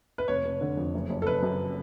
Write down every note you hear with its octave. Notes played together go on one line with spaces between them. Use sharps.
B4
F1 C#5
F1
D3
F2
F#1
F#1
A4
C#3 B4
F#2